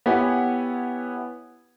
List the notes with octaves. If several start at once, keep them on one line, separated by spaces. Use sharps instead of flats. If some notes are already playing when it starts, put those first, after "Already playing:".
B3 E4 G4 C#5 F#5 G#5